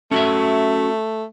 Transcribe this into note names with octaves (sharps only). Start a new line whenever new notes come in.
A3 C#4 F#4 E5